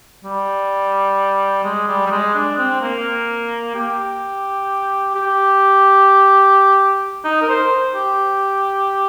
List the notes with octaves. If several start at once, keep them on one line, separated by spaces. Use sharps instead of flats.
G3
G#3
G3
G3
G#3
D4
C4
A#3
G4
G4
D#4
A#4
C5
G4